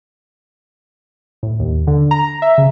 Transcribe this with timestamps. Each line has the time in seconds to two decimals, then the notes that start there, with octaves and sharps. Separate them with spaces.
1.43 A2
1.59 D#2
1.87 D3
2.11 A#5
2.42 E5
2.58 C#3